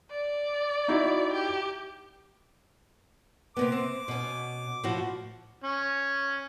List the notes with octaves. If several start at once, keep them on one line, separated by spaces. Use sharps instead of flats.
D5
D#4 E4 F#4
G4
C3 A#3 B3 D6
C4
B2 C#4
A2 F3 F#4
C#4